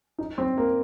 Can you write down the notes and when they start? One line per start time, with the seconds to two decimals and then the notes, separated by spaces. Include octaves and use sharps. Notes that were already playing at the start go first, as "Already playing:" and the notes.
0.18 D#4
0.38 C4
0.58 A#3